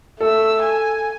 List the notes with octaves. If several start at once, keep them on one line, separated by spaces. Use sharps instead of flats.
A3 A4 E6
G#5